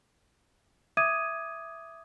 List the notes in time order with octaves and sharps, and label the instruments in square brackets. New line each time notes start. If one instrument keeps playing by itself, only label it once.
[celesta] E5 D6 D#6 G#6 D#7